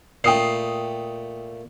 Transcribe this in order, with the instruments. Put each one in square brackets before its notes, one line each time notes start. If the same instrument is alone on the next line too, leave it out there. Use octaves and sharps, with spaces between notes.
[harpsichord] A#2 A3 [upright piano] G5 D#6 C7